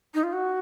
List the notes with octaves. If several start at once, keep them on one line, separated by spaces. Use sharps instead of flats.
D#4
F4
F#4